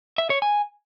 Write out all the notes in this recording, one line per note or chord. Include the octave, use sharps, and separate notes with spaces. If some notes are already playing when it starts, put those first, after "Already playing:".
E5
C#5
G#5